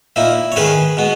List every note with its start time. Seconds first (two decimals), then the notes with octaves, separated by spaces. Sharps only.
0.16 A#2 A#3 D#4 E4
0.52 C#5
0.56 G#2 D#3 G#3 C#4 G#4 B4
0.97 B2 G#3 B3